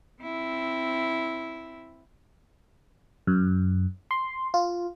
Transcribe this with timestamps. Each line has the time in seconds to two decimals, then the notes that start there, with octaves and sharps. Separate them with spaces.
0.22 C4 E4
3.27 F#2
4.11 C6
4.54 F4